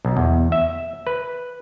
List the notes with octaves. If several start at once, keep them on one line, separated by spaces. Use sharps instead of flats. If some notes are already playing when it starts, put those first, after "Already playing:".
B1
E2
E5
B4